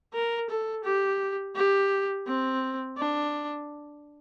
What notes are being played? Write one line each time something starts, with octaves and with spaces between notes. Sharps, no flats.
A#4
A4
G4
G4
C4
D4